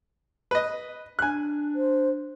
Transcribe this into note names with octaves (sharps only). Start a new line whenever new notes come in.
B4 D#5
D4 G#5 F#6
C5